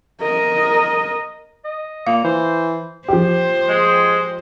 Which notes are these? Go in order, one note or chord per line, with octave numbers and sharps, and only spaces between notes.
A#4 D#5
D#5
A#2 A#3 F5
E3 C5
F3 G4 C5
G#3